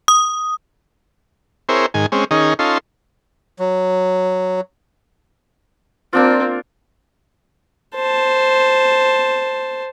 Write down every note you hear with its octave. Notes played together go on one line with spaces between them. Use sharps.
D#6
C4 E4 G#4 A#4 C5 C#5
G#2 D#3 G#5
G#3 C4 C#4
D#3 C#4 D#4 G#4
C#4 D#4 F4 A4 C6
F#3
A#3 C4 D4 F4
C5 A5